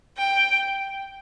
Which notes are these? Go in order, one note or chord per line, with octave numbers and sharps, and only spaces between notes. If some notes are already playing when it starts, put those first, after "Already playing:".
G5